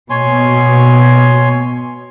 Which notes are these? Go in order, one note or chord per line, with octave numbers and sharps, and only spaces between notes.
B2 C#5 G#5 C6